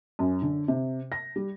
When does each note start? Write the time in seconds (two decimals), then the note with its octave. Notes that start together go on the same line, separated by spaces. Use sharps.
0.19 F#2
0.42 D3
0.68 C3
1.12 A#6
1.36 G3